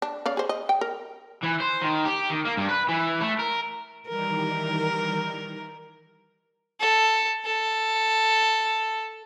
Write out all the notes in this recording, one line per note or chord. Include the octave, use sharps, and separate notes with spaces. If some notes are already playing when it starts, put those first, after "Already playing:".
D4
C#3 D5 F5
G#4 C5
D#5
G5
A#4
E3
C5
D#3
G4
D#3
A#3
G2
B4
E3
A3
A#4
D#3 E3 G3 A#4
A4
A4